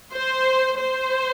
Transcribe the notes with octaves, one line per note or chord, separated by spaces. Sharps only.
C5
C5